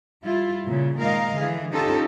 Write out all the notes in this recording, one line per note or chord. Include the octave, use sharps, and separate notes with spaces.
G3 E4 F4
A#2 C#3
A#2 D#3 G#3 A#4 D#5 F5
D3 E3 G#4
C#4 D#4 F4 G4 A4